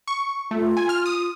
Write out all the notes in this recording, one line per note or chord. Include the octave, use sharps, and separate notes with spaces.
C#6
A3 F4
G#5
F6
D#6